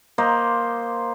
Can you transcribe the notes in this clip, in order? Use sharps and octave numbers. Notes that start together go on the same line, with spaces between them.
A#3 C5 D#5